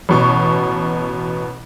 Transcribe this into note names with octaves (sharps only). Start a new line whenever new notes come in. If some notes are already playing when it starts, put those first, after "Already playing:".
A1 B2 C#6